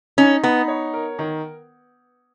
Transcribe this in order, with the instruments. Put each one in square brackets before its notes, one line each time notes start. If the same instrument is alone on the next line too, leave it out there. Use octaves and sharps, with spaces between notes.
[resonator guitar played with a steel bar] C#4 [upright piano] D#4
[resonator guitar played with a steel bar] B3 [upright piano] D#4
[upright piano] C#5
A#4
D#3